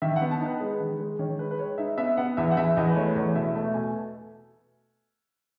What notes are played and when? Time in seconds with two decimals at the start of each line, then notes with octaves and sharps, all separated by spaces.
0.02 D#3 E5
0.16 F#5
0.21 B3
0.31 A5
0.41 D#4
0.46 B4
0.61 G#3
0.80 D#3
1.00 G#3
1.19 D#3 C#5
1.39 G#3 B4
1.51 B4
1.59 G#3 C#5
1.78 D#4 E5
1.98 B3 E5
2.17 B3 F#5
2.37 E2 E5
2.51 F#5
2.57 E2 E5
2.76 E2 D#5
2.87 B4
2.96 A3 C#5
3.16 E2 C#5
3.35 B2 E5
3.55 A3 E5
3.74 B2 G#5